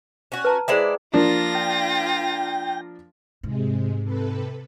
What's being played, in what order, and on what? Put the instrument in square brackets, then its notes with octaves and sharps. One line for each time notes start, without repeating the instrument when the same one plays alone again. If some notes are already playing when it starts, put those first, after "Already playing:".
[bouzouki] C#4 F#4
[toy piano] B4 A5 A#5
[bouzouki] G#3 E4 D5 [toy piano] G#4 C5 G5
[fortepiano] F3 A#3 D4 [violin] F4 A#6
[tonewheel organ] G5
[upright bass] G#2 [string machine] C3 G#3
[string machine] C3 A4 B4